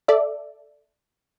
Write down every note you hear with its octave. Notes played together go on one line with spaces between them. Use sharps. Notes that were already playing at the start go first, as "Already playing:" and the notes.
A4 D5 E5